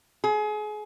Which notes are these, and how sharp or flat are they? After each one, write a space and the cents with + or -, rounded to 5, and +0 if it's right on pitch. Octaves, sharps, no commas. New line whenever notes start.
G#4 +30